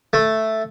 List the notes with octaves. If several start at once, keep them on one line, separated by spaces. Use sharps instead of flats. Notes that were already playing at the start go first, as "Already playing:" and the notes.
A3